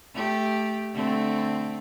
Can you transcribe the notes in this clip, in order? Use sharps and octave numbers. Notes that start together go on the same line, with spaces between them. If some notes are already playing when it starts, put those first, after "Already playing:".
A3 G4
D3 A3 C4